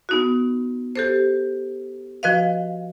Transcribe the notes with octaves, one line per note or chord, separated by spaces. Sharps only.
B3 D#4 F#4
G4 A4 C5
F3 F#4 B4 D#5 F5